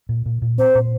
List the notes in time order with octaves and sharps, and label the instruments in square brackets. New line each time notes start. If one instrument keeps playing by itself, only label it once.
[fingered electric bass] A#2
A#2
A#2
[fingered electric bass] C4 [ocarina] C5
[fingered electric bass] A#2